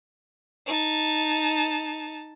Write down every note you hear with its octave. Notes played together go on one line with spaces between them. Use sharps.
D#4 A5